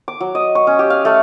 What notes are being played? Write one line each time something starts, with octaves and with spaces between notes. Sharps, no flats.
D6
F#3
D#5
C#6
C#4
G4
F5
A3